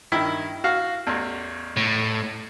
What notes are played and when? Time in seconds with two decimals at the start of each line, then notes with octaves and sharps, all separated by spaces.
0.12 G2 D#3 E4
0.64 F#4 F5
1.07 A1 E2
1.77 A2